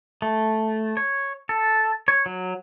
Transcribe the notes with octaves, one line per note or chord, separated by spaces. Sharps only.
A3
C#5
A4
C#5
F#3